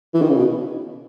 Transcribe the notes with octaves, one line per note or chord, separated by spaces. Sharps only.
E3
D#3
C#3
B2